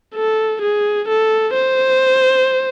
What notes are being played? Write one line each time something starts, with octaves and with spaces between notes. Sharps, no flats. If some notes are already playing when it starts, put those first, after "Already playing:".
A4
G#4
A4
C5